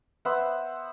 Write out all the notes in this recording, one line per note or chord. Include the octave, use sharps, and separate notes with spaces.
B3 C5 E5 F#5